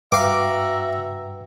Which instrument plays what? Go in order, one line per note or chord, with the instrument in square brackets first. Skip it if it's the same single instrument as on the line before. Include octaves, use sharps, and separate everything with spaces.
[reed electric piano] G2 B4 G5 [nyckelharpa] F#4 A#5 [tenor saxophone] E5 [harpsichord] F5 D6